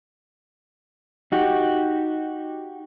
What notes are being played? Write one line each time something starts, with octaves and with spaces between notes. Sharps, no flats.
D#4 F#4 G4